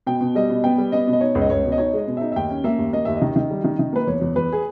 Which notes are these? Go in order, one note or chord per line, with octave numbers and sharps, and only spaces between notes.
B2 G5
B2
G3 D#5
B2
B3 G5
G3
B3 D#5
B2
D#5
D#4 C#5
C#2
D#5
C#2 C#5
B2
D#5
D#4 C#5
G#3 D#5
B2
D#4 E5
E5
D#2 G5
C#4
A#3 E5
D#2
A#3 D#5
D#2 E5
D#3 D#5
D#3
G3
D#3
D#3
A#3 B4
E2 C#5
E2
E2 B4
G#4